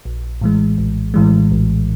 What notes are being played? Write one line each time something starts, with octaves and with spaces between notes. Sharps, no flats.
A#1
A2 E3 G#3
A#1
A2 E3 G#3
A#1